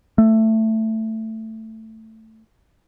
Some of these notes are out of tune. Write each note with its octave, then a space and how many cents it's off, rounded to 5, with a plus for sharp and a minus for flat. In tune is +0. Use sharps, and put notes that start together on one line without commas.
A3 +10